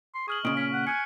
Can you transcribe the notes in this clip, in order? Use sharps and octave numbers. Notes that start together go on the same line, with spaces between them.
C6
G#4 C#6 F6 F#7
A#2 C#3 D#5 F6 D7
C#4 B6
F#5
G#5 F6 F#6 C#7